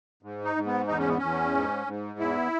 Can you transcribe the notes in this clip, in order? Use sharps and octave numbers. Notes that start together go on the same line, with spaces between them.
G#2
D#4
G#2
B3
E2 D#4
C#4
B3
E2 C#4
G#2
G#2
E2 E4